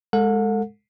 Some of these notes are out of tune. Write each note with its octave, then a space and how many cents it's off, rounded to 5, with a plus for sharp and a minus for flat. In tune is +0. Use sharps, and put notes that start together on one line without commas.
G#3 +0 A4 +30 F#5 -40